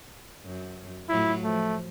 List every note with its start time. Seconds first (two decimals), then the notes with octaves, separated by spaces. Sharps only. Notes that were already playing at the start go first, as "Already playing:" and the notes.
0.45 F#2
1.09 A2 F#3 E4 F4
1.44 F3 A3